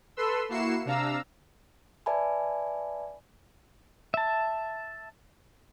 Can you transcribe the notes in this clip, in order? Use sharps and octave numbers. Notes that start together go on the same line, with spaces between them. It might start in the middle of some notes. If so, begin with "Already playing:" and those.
A4 B4 C6 E6
A#3 E4 F#4 C7 C#7 E7
C3 D4 F5 A#5 E6
B4 D5 E5 G#5 A5 B5
E5 A5